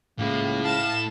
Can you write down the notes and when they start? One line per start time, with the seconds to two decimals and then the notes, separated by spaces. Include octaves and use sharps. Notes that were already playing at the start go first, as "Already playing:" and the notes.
0.19 C#2 A2 A#3 E4
0.64 F5 A5 E7